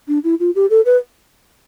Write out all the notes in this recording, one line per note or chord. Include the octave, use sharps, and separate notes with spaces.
D4
E4
F4
G4
A4
B4